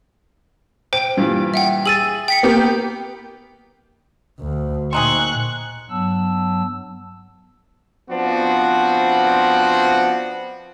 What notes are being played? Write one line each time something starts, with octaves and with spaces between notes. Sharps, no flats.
C5 G5 D7
G2 A#2 E3
E5 F#5 G5
G#4 E6 A6 D#7 F#7
G5 B6 C#7
A#3 B3 G4
D2
A#2 C4 D#4 G#4 C#6 F#6
G2 F#3 B3 A5 E6
F3 B3 C4 D4 F#4